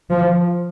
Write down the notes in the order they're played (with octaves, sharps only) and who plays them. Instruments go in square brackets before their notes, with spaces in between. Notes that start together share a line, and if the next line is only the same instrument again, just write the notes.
[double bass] F3